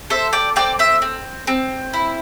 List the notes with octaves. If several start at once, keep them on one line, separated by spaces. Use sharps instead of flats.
A4 C5 E5
D5 G5
C4 D5 G5
C5 E5
C4
C4
E4